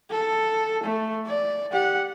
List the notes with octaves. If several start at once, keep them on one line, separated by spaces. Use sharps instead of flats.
A4
A3
D5
G4 F#5